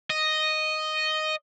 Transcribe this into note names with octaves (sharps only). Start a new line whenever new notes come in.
D#5